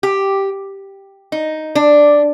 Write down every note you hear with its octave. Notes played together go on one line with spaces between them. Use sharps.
G4
D#4
D4